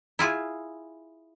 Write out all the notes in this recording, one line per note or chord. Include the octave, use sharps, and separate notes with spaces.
E4 F4 G#4